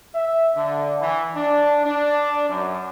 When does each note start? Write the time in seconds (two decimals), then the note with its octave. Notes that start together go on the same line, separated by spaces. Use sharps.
0.15 E5
0.56 D3
1.01 E3
1.36 D4
1.86 D4
2.49 F#2